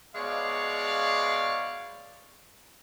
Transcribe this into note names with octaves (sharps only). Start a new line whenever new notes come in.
B2 G#3 C#5 D5 F5